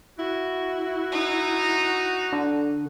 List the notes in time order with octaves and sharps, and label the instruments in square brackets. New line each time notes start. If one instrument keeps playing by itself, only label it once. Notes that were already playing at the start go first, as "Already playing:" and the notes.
[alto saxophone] E4 [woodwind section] F#4
[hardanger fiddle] D#4
[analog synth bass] D3